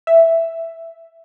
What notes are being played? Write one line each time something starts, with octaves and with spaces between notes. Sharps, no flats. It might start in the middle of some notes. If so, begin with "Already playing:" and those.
E5